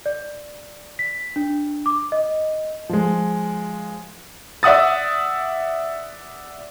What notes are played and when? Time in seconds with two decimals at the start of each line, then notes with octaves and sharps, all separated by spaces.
0.06 D5
0.99 B6
1.36 D4
1.86 D6
2.12 D#5
2.89 F3 G#3
4.63 D5 E5 F#5 D#6 A6